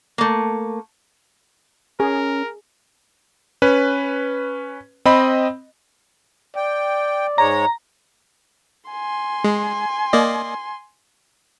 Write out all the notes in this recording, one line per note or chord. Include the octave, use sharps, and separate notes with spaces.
A3 A#3
C#4 G#4 A#4
C#4 B4
C4 D#5 B5
D5 G5
G#2 G#3 C#5 A#5
G#5 C6
G#3
A#3 D5 D#5